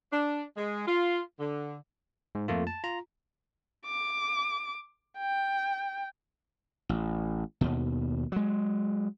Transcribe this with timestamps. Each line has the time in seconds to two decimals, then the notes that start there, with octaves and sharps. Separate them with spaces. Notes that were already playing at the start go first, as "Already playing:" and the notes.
0.12 D4
0.57 G#3
0.87 F4
1.39 D3
2.35 G#2
2.48 F2 A3 A#3 F4
2.67 A5
2.84 F4 A#5
3.85 D6
5.18 G5
6.89 A1
7.61 D#2 B2
8.32 F#3 G#3